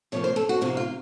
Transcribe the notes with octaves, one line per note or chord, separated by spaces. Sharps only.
F2 C3 F3 A#3 C#5
C5
A4
F#4
F2 C3 F3 A#3 F4
F4